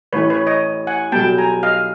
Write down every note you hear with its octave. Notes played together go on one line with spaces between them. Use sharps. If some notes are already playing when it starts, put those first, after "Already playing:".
A1 A2 E3 B4 C#5
B4 C#5
C#5 D#5
F#5 G#5
B1 B2 G3 B3 G5 A5
G#5 A#5
D#5 F5